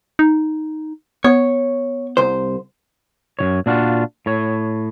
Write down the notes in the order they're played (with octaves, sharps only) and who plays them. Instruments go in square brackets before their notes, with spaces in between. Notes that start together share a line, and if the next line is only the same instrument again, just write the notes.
[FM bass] D#4
[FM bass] B3 [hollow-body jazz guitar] C#5
[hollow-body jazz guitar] C2 C5
[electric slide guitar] F#2 D#3 C#5
A#2 D4 F4 F#4
A2 C#5